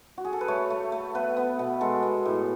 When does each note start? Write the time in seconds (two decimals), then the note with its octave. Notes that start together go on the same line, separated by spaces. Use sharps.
0.18 F#4
0.25 G#4
0.33 A4
0.41 B4
0.48 A3 C#5
0.70 A3
0.92 A3
1.15 B3 B4
1.37 B3
1.59 B2
1.81 G#3 A4
2.03 B3
2.25 A2